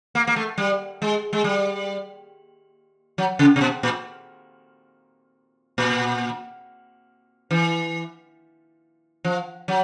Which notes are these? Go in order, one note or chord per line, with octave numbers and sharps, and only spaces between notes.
A#3
A#3
A3
G3
G#3
G#3
G3
F#3
C#3
C3
B2
A#2
A#2
E3
F3
F#3